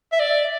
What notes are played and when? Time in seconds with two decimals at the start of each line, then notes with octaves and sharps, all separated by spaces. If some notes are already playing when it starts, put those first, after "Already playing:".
0.12 E5
0.20 D5